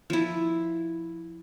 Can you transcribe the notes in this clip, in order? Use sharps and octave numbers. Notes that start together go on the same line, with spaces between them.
F3 E4